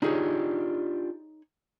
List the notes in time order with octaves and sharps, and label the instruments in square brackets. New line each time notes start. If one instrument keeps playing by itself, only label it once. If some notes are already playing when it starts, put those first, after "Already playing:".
[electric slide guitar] D4 F4 G4 [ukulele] D#4 G#4 C#5